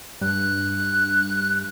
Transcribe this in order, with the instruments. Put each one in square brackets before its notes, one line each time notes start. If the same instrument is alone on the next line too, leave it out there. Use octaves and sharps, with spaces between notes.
[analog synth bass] G2 [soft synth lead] F#6